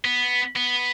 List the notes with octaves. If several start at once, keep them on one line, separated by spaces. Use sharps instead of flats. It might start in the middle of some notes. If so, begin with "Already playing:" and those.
B3
B3